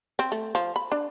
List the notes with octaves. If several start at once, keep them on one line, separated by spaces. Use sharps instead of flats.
C4
A3
F3
B5
D4